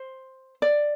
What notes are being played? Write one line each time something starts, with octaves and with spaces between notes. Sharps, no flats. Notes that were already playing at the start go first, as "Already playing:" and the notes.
Already playing: C5
D5